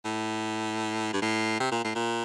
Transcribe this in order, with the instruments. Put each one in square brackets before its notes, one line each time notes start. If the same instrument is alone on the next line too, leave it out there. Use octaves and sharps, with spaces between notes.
[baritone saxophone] A2
G2
A2
C3
A#2
A2
A#2